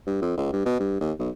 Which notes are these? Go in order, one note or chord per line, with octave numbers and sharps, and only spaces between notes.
G2
F2
C#2
G2
B2
G2
D#2
B1